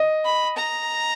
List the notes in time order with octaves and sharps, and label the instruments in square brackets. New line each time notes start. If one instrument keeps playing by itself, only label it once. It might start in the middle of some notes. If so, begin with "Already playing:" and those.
Already playing: [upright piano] D#5
[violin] B5
A#5